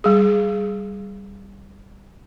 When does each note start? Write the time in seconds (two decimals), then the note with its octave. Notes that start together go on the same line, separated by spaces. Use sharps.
0.04 G3 G#4